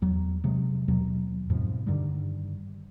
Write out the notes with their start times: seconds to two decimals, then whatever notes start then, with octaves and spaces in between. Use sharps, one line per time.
0.02 E2 F#3
0.44 C3 F#3 G#3
0.88 D#2 B2 F#3
1.49 F2 G#2 B2 F3
1.86 G2 D3 D#3 G3